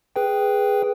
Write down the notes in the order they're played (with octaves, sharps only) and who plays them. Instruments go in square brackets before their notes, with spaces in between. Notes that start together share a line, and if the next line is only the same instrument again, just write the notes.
[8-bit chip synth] G#4 B4 G5